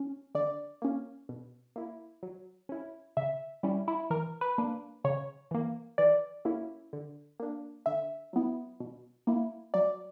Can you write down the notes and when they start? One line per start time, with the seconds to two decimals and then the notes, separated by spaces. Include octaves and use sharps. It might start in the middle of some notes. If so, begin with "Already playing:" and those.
Already playing: C#4
0.35 D3 D5
0.82 A#3 C#4
1.29 B2
1.76 A#3 E4
2.23 F#3
2.69 C#4 E4
3.17 C#3 E5
3.63 G3 C#4 E4
3.88 E4
4.10 E3 A#4
4.41 B4
4.58 A#3 D4
5.04 C#3 C#5
5.51 E3 A#3
5.98 E3 D5
6.45 A#3 C#4 E4
6.93 D3
7.40 A#3 D4
7.86 D3 E5
8.33 F#3 B3 E4
8.80 B2
9.27 A#3 E4
9.74 F#3 D5